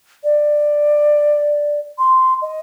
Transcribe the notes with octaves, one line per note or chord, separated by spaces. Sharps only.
D5
C6
D#5